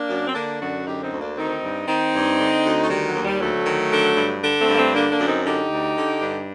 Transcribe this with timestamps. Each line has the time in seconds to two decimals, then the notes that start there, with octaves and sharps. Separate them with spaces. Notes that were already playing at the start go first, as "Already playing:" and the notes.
Already playing: A#3 D4
0.10 F#2
0.26 C4
0.35 D3 A#3 D4
0.60 F#2 D4 F#4
0.86 D3 D#4 G4
1.03 C4 D#4
1.11 D2
1.21 A#3 D4
1.37 D#3 C4 D#4
1.62 G2
1.88 D#3 C4 D#4
2.14 G2
2.39 D3
2.65 D2
2.80 A3
2.90 D#3 G3
3.06 F#3
3.15 D#2
3.24 G3
3.41 D2 F#3 A3
3.66 D#3
3.92 D3
4.17 G2
4.42 D3
4.60 A3 C4
4.68 G2 A#3
4.77 A3 C4
4.93 D3 A#3 D4
5.10 A#3 D4
5.19 F#2
5.28 C4 D#4
5.45 D3 D#4 G4
5.71 D2
5.96 D3
6.21 G2